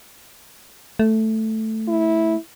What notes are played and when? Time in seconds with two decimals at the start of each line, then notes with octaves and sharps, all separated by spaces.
0.99 A3
1.88 E4